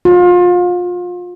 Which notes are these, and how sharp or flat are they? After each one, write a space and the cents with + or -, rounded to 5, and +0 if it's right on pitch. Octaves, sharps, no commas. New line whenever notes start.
F4 +30